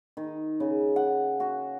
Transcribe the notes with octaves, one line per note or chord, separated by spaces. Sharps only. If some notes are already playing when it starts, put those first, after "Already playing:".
D#3
C#3
F#5
F#4